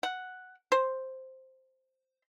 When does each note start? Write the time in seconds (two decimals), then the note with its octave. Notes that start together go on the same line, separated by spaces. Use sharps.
0.03 F#5
0.72 C5